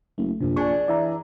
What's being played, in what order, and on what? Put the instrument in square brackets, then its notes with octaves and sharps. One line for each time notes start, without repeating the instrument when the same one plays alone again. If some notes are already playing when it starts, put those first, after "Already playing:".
[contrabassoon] F#1 [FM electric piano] A3
[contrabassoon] A#1 [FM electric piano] F#2 C3
[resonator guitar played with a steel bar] D4 G#4 [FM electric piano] G#5 C#6
[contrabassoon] E3 [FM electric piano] D5 E5 A#5